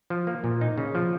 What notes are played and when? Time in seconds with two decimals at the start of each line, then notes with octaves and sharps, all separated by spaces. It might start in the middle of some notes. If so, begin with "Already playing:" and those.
0.10 F3
0.27 A#3
0.44 A#2
0.61 D#4
0.78 C#3
0.95 F3